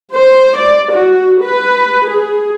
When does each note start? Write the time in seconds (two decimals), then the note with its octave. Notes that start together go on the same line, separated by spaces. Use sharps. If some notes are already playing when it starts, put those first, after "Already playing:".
0.16 C5
0.59 D5
0.94 F#4
1.44 B4
2.08 G#4